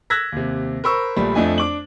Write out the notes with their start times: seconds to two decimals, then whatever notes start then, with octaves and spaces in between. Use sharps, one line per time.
0.10 E6 F#6 G#6 A#6 B6
0.32 D#2 C3
0.84 A#4 C5 B5 C#6 E6
1.16 A#1 G3 A3 B5
1.35 F2 A3 D4 D#5 G#5
1.58 D4 D6 F#7